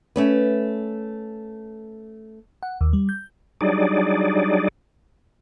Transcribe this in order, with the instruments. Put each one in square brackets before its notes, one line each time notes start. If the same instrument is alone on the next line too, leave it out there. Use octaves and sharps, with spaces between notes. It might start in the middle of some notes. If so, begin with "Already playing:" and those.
[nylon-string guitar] A3 C#4 B4
[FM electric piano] F#5
D#2
G3
G6
[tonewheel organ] F#3 G3 D4 D#4 G#4 D5